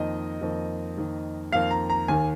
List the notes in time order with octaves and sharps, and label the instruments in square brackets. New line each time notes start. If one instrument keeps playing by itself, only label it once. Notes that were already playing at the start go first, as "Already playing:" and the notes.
Already playing: [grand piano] F2 D#3 A#3 D#5
F2 D#3 A#3
F2 D#3 A#3
F2 D#3 A#3 F5
A#5
A#5
D#2 D#3 A#3 G#5